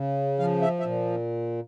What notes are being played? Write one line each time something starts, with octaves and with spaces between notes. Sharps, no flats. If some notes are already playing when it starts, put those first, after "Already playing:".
Already playing: C#3
F3 F5
E5
E5
A#2